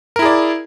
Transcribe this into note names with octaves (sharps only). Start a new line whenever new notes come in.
E4 G#4 A#4 D5